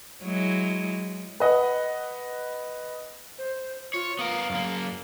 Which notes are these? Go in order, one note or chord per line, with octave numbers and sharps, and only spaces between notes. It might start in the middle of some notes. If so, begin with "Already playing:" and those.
F#3 G#3 E4
B4 D#5 F#5
C5
F4 C#5
B3 A#4 F5
F#2 A#3